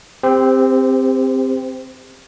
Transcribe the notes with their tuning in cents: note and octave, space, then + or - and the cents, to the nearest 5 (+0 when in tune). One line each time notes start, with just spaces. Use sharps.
C4 +0 G4 +30 C5 -30